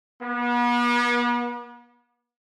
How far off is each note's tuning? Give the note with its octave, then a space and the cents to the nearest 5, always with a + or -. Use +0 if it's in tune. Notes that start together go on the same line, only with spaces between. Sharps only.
B3 -40